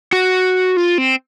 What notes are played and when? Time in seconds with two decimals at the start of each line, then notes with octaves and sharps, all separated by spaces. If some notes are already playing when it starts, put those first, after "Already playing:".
0.13 F#4
0.77 F4
0.98 C4